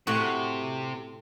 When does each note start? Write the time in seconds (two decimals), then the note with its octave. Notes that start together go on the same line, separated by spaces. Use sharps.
0.07 A2 C3 F#4